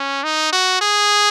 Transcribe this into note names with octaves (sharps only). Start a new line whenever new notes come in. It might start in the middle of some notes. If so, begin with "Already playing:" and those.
Already playing: C#4
D#4
F#4
G#4